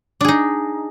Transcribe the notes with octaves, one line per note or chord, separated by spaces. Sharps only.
D4 D#4 G#4